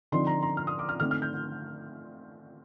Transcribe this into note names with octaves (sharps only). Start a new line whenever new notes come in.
D3 F3 C4 D#4 C6
A#5
A#5
F6
D#6
D6
F6
D3 A3 C4 D#4 F6
F6
G6